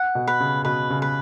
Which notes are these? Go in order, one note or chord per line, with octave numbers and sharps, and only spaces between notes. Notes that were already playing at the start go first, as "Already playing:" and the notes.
Already playing: F#5
B2
B4
C#3
B2 B4
C#3
B4